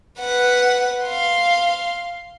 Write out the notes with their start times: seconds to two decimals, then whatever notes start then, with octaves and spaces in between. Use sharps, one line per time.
0.20 B4 F#5
1.06 F5 C6